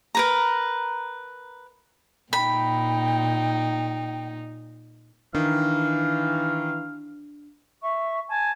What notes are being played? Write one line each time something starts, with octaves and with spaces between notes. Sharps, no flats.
A#4 B4 A#5
A#2 D#4 G5 B5
D#3 E3 D4 F5
E5 C#6
G#5 A5